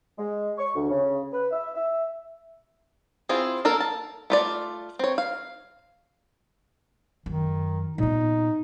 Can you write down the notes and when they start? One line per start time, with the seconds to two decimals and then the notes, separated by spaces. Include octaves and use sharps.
0.18 G#3
0.58 C#6
0.75 D2
0.90 C#3
1.33 B4
1.51 E5
1.75 E5
3.29 C4 E4 F4 G#4
3.65 A#3 A4 A#4
3.80 A5
4.30 A3 F4 D5
4.99 C4 C#5
5.18 F5
7.26 F#2 D#3
7.98 A#2 B3 D#4